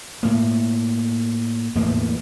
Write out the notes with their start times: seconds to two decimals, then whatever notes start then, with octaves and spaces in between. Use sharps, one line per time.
0.23 A2 A#3
1.75 E2 A2 A#3 B3